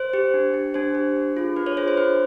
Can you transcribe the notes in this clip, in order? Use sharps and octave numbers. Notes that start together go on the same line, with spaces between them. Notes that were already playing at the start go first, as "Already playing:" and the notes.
Already playing: C5
G4
D4
G4
D4 C5
G4
D4
F4 G#4
D4 B4
B4 C#5
F4 G#4 C5
C5
D4 B4